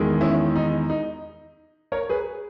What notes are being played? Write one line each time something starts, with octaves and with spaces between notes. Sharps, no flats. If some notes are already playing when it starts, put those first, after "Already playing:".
Already playing: E2 D#3 G#3
C#4 E4
D#4
D#4
A#4 C#5
G#4 B4